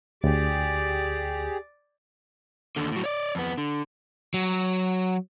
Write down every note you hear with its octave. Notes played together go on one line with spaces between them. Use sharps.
D2 G4 G#4 D5
D#2 D3
A2 F#3
C#5 D5
F2 B3
D3
F#3